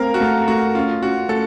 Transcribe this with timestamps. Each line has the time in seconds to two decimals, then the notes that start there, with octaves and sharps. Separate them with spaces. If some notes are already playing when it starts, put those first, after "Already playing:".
Already playing: A3 C4 A#4 F5
0.14 F#4
0.20 A3 A4
0.48 A3 F#4
0.75 C#4 F4
1.02 C#4 F#4
1.29 A3 A4